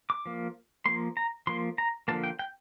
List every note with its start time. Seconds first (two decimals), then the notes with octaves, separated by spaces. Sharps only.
0.10 D6
0.26 F3 A#3
0.86 F3 A#3 C6
1.17 A#5
1.47 F3 A#3 C6
1.78 A#5
2.08 D3 F3 A#3 A5
2.24 G5
2.39 G5